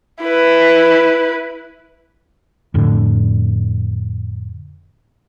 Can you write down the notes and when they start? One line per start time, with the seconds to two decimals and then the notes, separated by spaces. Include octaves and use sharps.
0.22 E4 B4
2.74 F2 A2 D3